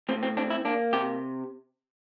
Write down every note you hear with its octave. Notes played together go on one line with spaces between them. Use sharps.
A2 C4
C4
C4 D4
E4
A#3 D4
C3 G4